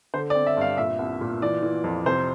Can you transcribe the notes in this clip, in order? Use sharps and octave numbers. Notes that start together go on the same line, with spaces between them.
D3 C5
D5
C4
E5
G2 F5
A#2 E5
C2
A#2
E3 D5
E3
F2
C3 C5